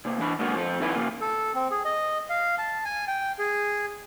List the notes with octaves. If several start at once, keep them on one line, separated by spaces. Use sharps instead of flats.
C3 A#3
E3 D4 B5
G#2 D3 F#3 A#3 B3 F#4
F3 C4 A4
D#2 D#3 C4 E4 B4
C#3 A#3
A4
C4
G#4
D#5
F5
A5
G#5
G5
G#4